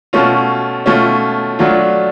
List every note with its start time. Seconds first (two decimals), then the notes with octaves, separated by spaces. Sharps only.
0.13 B2 A3 C#4 F4
0.86 B2 A3 C#4 F4
1.59 F#3 A3 D4 F4